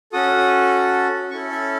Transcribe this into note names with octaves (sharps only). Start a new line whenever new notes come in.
C#4 F#4 A4 D#6
C#4 E4 A4 C#6
E5